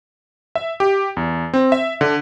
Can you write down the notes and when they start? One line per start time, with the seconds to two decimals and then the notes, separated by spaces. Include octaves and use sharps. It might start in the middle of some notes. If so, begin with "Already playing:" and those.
0.55 E5
0.80 G4
1.17 E2
1.54 C4
1.72 E5
2.01 D3